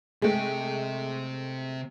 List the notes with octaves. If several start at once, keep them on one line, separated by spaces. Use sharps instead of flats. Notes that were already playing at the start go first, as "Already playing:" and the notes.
C3 G#3 A3 G5